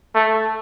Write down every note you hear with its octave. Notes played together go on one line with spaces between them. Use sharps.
A3